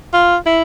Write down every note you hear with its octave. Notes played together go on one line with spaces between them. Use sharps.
F4
E4